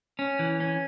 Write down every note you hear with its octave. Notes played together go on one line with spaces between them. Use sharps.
C#4
E3
C#4